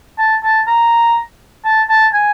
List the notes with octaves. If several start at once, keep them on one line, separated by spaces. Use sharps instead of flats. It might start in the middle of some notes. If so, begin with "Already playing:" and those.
A5
A5
A#5
A5
A5
G#5